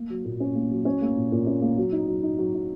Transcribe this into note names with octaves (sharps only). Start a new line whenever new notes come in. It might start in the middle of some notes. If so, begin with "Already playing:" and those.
Already playing: A#3
F#3
A#2
C#4
A#3
F#3
C#4
A#3
A#2
A#2
C#4
A#3
F#3
D#4
F#3
D#4
F#3
D#4